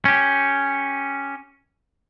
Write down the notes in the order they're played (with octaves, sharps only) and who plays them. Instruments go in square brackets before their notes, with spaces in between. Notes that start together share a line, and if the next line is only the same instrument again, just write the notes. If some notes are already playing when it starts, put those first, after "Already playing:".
[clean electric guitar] C#4 G4